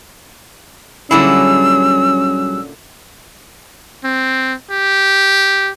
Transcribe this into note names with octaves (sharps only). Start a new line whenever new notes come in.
A#2 D3 F#3 G3 C#4 E4 G#4 E6
C4
G4